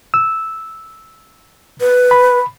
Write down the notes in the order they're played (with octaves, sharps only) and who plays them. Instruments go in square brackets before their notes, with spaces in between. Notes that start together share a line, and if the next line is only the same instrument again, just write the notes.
[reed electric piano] E6
[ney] B4
[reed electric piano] B5